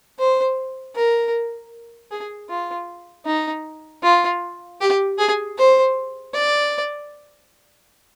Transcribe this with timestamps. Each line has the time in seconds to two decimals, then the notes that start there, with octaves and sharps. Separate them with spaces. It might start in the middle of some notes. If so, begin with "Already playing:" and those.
0.19 C5
0.96 A#4
2.11 G#4
2.49 F4
3.26 D#4
4.03 F4
4.81 G4
5.19 G#4
5.58 C5
6.34 D5